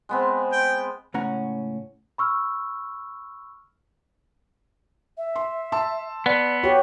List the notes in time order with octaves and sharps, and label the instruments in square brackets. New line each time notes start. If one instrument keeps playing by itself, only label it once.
[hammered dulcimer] G#3 B3 C4
[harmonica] G5
[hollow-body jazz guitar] C#2 A2 C#4 F#5 A#5
[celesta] B5 C#6 E6 F6
[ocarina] E5
[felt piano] C6
A5 C6 E6
[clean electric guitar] B3 [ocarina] D5
[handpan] F#4 G4 [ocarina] C#5